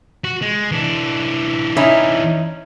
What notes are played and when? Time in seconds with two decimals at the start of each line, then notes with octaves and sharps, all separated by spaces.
0.24 F#4
0.42 G#3
0.72 E3 D4
1.77 C#4 D#4 E4